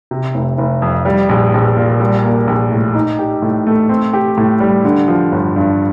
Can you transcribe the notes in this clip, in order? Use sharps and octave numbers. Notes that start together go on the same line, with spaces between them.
C3
F1
F1
F2
G3
A#1
A#1
A#2
G3
A#3
A#1
A2
D#4
G4
A2
A3
C4
G4
A2
G3
D3
F3
G1
G2